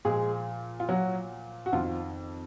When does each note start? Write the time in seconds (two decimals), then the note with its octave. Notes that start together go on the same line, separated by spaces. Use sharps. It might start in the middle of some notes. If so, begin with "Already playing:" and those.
0.05 A#2 F3 G#3 G#4
0.80 F4
0.89 F#3 F#4
1.66 F#4
1.73 F2 D#3 F3 F4